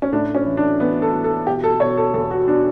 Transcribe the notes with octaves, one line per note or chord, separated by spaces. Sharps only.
C#4
A2 D4
C#4
E3
D4
E3 B3
A4
E3
A4
B2 G4
A4
B2 C#5
A4
E2 A4
F#4
B2 D4